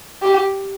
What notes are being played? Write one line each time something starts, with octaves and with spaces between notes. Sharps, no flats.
G4